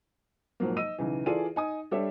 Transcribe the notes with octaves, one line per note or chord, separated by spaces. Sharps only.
B1 G#2 F3 F#3 A#3
D#5 E6 D#7
B1 C#3 E3
E3 F4 G#4 A4 D5 D#7
D#4 G#5 D#6
G3 D4 G4 A4 C#5 E5